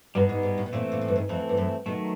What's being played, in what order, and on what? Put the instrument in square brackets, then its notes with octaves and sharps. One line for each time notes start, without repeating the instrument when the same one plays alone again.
[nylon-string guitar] G2 [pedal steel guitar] G3 B3 D#4 G#4
[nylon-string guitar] G#2
G#2
A2
B2
[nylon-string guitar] A#2 [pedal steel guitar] E3 A3 C4
[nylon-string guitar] A#2
A2
G2
G#2
[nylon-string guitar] F2 [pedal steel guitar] E3 A3 C4
[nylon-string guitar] G2
F#2
[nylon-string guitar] B2 [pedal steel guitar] D#3 F#3 A3